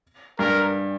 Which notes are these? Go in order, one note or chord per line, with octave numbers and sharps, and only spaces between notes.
G2 A#4